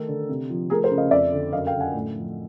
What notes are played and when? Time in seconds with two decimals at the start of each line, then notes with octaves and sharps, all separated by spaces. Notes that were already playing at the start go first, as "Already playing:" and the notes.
Already playing: D#3 A3 A4
0.08 D3
0.29 C3
0.50 F3
0.70 A3 G#4 A#4
0.83 A#4 C5
0.91 C#3
0.98 D#5 F5
1.11 F2 D5 E5
1.32 D3
1.53 F#2 D#5 F5
1.67 F5 G5
1.74 D3
1.80 F#5 G#5
1.94 A2
2.15 F3